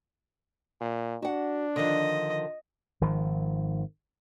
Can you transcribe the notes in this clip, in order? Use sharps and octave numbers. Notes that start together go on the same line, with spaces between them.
A#2
D4 F#4 F#5
D3 D#3 F3 D#5
G#1 D#3 F3